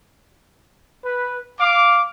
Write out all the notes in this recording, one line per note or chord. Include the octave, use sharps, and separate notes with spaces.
B4
F5 D6